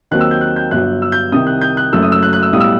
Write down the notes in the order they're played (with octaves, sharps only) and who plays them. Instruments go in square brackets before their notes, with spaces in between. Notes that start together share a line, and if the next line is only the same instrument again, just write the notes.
[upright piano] D#2 D#3 F#3 C4 F#6
E6
G6
F#6
G6
G1 G2 F#3 F#6
E6
G6
C2 C3 D#3 D#6
F#6
G6
F#6
F#1 F#2 F#3 A3 E6
D#6
E6
F#6
F#6
E6
B1 A2 G3 D#6
E6